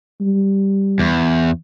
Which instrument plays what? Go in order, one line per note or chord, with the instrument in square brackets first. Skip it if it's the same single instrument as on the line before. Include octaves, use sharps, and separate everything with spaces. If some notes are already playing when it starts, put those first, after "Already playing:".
[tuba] G3
[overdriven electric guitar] E2